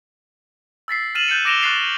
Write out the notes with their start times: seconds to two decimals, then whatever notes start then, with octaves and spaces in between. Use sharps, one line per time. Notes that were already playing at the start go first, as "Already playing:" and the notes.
0.88 E6 A6 B6 C7
1.15 F6 A6 D#7 E7 F#7
1.28 F#6 G6 A6 C#7
1.45 D6 A#6 D7 E7 F7 G7
1.62 C#6 F#6 A6 C7 F7